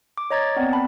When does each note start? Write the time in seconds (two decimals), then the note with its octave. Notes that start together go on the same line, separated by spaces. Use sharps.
0.18 D6
0.31 C#5 D#5 A#5 G#6 A6
0.56 B3 C4 D5
0.73 A5 B5